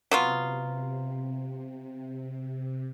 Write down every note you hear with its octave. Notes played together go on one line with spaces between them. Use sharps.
C3 F#3 B3 F4